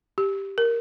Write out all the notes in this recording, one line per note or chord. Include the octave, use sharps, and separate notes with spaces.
G4
A#4